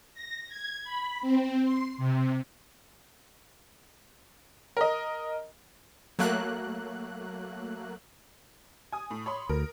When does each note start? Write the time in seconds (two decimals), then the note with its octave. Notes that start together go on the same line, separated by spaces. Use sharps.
0.14 A#6
0.48 G#6
0.84 B5
1.21 C4
1.62 C6
1.98 C3
4.77 A#4 D#5
6.19 F#3 A3 A#3 F#6
8.92 G#5 D#6
9.10 A2
9.26 C#5 B5 C6
9.49 D2 A#4